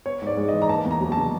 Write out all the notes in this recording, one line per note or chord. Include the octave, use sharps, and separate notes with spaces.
B3 C#5
G#2
D5
G#3
D#5
E3
A#5
A#3 A5
E2
A#5
F#3
A5
C#3